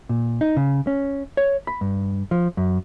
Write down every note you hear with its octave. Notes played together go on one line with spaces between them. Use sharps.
A#2
D#4
C#3
C#4
C#5
B5
G2
F3
F#2